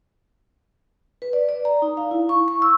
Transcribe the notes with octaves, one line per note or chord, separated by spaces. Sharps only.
B4
D5
D5
A#5
D#4
F5
E4
C#6
C#6
E6